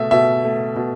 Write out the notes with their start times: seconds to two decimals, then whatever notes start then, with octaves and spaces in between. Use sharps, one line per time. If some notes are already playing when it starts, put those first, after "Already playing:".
Already playing: B2 A3 E5
0.11 B2 E5
0.45 A3
0.76 B2